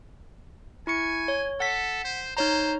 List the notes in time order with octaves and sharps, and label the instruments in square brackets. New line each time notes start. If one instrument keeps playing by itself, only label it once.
[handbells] E4 C#6 C#7 [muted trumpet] G#5
[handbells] C#5
[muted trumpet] A4 [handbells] F#5 B6
[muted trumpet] C5
[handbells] D#4 C#5 A#5 [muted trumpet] C5